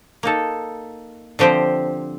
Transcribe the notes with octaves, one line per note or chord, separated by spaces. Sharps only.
A#3 D#4 A4
D3 F3 C4 G4 C5